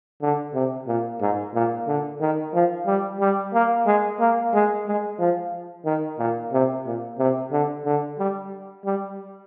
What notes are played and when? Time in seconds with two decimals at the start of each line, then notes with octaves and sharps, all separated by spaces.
0.21 D3
0.54 C3
0.87 A#2
1.21 G#2
1.54 A#2
1.87 D3
2.21 D#3
2.54 F3
2.87 G3
3.20 G3
3.53 A#3
3.86 G#3
4.20 A#3
4.54 G#3
4.87 G#3
5.19 F3
5.85 D#3
6.19 A#2
6.52 C3
6.86 A#2
7.19 C3
7.52 D3
7.85 D3
8.18 G3
8.85 G3